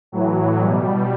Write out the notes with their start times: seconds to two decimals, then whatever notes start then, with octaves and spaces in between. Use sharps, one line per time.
0.12 A2 E3 F#3
0.59 B2 G3